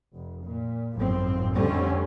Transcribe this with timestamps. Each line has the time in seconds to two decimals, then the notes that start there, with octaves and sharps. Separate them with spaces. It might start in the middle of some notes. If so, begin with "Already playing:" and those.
0.14 F1
0.44 A#2
0.96 G#1 F#2 A2 F3 C4
1.54 F2 D3 G3 A3 C4 C#4